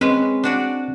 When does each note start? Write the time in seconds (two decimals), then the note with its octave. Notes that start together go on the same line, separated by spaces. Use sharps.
0.01 G#3 C4 C#4 B4
0.44 D4 F#4 D5